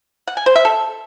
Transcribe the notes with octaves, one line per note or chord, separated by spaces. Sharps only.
F#5
G#5
C5
E5
A4